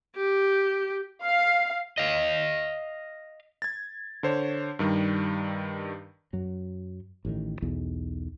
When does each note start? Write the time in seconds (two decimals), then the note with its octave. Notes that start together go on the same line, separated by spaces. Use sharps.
0.16 G4
1.23 F5
1.98 D#5 F5
3.62 G#6 A6
4.23 D3 C5 C#5
4.79 G2 D#3 G3
6.33 F#2 F#3
7.25 A1 A2 D#3
7.62 B1 E2